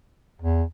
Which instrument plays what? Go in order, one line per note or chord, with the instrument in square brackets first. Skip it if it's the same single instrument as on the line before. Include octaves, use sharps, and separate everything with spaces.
[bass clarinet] E2